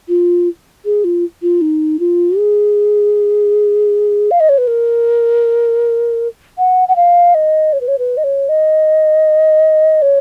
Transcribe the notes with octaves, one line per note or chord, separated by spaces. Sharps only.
F4
G#4
F4
F4
D#4
F4
G#4
F5
D#5
C#5
B4
A#4
F#5
F#5
F5
D#5
C#5
B4
C#5
B4
D#5
C#5
D#5
C#5